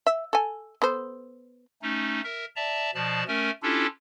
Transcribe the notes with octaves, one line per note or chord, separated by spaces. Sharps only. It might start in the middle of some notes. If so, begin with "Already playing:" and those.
E5
A4 G#5
B3 A4 C5
A3 C#4 D#4
A#4 E5
D5 E5 A5 A#5
B2 F3 D5 A5
A3 C#4 A#4 G#5
C#4 D4 E4 F4 G4 A4